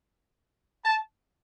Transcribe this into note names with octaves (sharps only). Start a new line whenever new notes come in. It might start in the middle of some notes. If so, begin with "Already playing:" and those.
A5